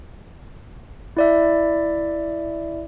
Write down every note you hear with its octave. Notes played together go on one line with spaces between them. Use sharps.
E4 D5 E5